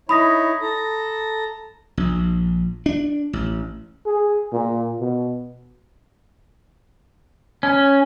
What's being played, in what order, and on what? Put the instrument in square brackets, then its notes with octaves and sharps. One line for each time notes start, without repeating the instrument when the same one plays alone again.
[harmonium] D#4 E4 C#5 [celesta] B5 D#6 A#6
[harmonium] A4 A#5
[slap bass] A#1
D4
A1
[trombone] G#4
A#2
B2
[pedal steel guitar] C#4